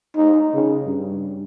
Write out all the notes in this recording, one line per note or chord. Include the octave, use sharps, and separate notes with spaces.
D#4
C#3
G2